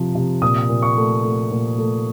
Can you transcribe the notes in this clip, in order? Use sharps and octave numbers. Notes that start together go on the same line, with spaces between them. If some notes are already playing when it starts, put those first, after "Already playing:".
Already playing: C3 F3
C3
A#2 D#6
A#2
C#6
A3
A3
A#2
A3